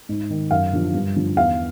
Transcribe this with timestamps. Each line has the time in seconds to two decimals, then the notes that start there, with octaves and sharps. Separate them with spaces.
0.09 G#2
0.30 D#3
0.51 F#2 F5
0.73 D3 F3
0.94 G2
1.16 D3 F3
1.36 E2 F5